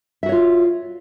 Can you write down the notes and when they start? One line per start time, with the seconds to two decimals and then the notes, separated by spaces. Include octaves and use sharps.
0.23 E5
0.26 F#4
0.29 C#5
0.32 F4